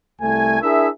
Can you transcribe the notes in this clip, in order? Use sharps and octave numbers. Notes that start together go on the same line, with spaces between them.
C2 A3 G#5
D4 E4 G#4 A#4 E5